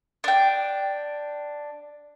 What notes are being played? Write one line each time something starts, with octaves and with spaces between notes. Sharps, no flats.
D4 G5